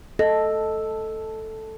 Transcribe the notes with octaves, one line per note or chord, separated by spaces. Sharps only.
A4 D#5